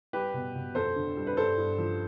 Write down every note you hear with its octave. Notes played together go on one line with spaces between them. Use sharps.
G3 G4 B4
B2
B2
F2 A4 C5
D3
G3
B4
G2 A4 C5
G2
F3